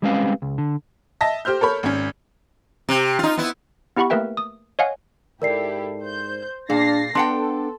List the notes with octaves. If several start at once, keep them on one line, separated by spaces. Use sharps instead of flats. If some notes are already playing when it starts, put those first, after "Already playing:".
G3 G#3 C4 C#4 B4 F5
C#2
D3
D#5 E5 A5 A#6
G4 C5 F6 G6
A4 A#4 C#5 B5
G#1 C#4
C3
D#4 F4
B3 E4
B3 E4 G4 F#5 B5 C#6
A3 A#3 A#4 B4 E5 G5
D#6
C#5 D#5 F5 F#5 G#5
G#2 E4 G4 A4 A#4 D5 C7
C5 G6
A#2 D4 G#4 F5 A6 A#6 C7
B3 D4 A4 F#5 G5 C6